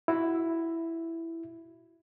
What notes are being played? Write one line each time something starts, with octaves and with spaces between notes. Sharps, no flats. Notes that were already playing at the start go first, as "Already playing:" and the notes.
E4 F#4